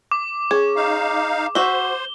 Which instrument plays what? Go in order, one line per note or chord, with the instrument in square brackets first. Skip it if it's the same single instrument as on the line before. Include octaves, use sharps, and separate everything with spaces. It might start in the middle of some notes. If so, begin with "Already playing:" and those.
[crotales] D6
[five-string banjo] C#4 [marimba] G#4
[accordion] D#4 F5
[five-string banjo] F#4 E5 [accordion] C5 [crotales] G7